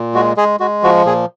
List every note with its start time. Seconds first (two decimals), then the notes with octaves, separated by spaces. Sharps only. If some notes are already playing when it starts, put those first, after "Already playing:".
Already playing: A#2
0.14 G#3 F#4
0.37 G#3 G#4
0.60 G#3 F#4
0.83 F3 F#4
1.05 A#2 G#4